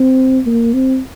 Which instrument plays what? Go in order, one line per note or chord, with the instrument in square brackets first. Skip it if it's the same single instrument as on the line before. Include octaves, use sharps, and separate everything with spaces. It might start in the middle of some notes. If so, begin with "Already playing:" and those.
Already playing: [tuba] C4
A#3
C4